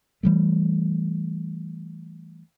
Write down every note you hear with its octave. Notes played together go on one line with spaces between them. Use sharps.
E3 G3 A3